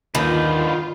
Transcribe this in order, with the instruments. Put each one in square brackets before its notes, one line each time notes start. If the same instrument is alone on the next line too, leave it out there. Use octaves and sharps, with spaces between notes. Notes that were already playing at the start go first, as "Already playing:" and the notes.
[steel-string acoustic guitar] D#2 [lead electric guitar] D3 B4 [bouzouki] D#3 [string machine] F4